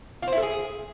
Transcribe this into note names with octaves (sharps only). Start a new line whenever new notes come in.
F4
C5
E4
A4
G#4